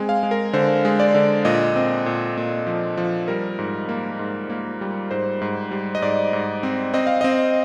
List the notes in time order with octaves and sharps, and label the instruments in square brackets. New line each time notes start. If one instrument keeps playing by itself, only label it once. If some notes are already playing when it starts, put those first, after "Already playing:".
Already playing: [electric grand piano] G#3 C4 G#5
F5
G#3
A#4
D3 C5
G#3
D5
D3
A#2 D#5
C4
A#2
A#2
F3
F3
G3 A#4
G#2
A#3
G#2
A#3
G3
G#2 C5
G#2
G3
D#5
G#2 D5
G#2
C4
C4 D#5
F5
C4 D#5